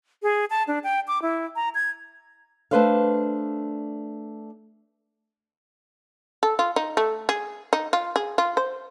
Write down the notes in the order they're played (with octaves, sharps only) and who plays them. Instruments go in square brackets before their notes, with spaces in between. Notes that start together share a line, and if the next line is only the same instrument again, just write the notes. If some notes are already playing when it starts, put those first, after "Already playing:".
[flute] G#4
A5
D4
G5
D6
E4
A#5
G#6
[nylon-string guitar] A3 D4 B4 C5 D5 F5
[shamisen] A4
F4
D#4
A3
G#4
D#4
F4
G#4
F4
C5